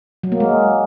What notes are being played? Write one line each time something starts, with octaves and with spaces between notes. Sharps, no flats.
F#3
A#3
G#3